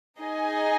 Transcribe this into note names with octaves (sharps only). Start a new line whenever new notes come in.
D#4 G#4 D#5 G#5